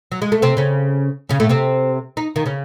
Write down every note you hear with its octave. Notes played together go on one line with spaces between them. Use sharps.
F#3
G#3
A3
C3 C4
C#3 C#4
C#3 C#4
A2 A3
C3 C4
D#4
D#3 D#4
C#3 C#4